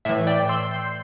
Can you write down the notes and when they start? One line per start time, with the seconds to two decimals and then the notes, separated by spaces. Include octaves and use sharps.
0.05 A2 E3 E5
0.27 D5 G5
0.49 C6 E6
0.71 G6 C7